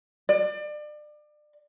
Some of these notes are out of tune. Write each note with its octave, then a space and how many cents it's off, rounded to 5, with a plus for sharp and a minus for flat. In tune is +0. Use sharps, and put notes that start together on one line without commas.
D5 +30